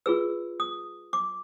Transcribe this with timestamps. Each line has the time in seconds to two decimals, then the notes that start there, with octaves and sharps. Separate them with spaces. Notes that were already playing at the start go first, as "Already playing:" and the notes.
0.06 F4 G#4 B4 E6
0.60 D#6
1.13 D6